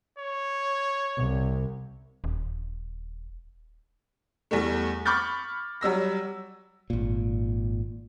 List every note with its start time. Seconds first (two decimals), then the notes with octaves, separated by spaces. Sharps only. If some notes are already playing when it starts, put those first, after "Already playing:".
0.19 C#5
1.17 C2
2.24 D#1
4.51 E2 G3 A3
5.06 B5 C#6 D6 F6 G6 A6
5.81 F#3 G3 E6 A#6
6.90 G#1 A#2